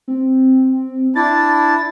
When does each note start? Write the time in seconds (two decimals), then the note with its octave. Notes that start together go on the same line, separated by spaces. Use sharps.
0.08 C4
1.16 D4 E4 A6